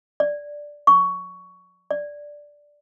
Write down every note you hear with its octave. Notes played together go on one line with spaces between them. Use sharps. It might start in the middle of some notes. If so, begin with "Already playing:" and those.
D5
C#6
D5